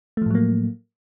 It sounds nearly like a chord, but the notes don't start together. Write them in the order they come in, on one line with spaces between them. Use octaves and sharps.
A3 F3 A2 F#3 A#3